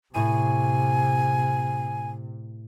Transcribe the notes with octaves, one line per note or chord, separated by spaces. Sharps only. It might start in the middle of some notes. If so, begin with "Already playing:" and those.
A2 C3 G#5 C#6 D#7